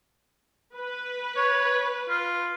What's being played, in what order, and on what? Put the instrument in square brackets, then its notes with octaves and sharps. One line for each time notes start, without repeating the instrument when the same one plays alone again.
[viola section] B4
[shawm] C#5
F4